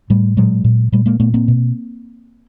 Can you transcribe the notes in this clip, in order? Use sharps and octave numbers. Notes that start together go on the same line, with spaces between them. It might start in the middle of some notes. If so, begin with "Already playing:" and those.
A2 G3 A3
A#2 F#3 G#3
A#2
A#2 G3 A3
G#3 A#3
A#2 A3 B3
A#3 C4
B2